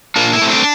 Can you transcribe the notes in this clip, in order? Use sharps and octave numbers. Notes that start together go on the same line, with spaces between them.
A#2 D4 F4
E4
A3 C4
D4